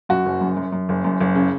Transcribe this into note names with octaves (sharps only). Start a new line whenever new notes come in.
F#2 F#4
F#1
F#2
F#2
F#2
F#1
F#2
F#1
C#3